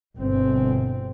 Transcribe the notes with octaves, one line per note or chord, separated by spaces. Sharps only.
G1 B2 C4